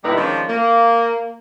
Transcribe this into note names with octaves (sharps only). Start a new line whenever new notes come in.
A#2 D3 G3 D#4 E4 B4
D#3 F3 G#3 C#4 D4
A#3